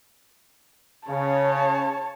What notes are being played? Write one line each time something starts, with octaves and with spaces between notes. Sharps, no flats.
C#3 C#5 A5